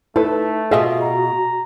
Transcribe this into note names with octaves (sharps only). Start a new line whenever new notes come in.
A3 D#4 E4 A4 B4
B2 F4 F#4 G#4 D#5 E5
A#5